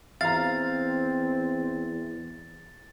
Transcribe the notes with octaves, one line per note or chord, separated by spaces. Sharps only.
E2 C4 F5 A#5 A6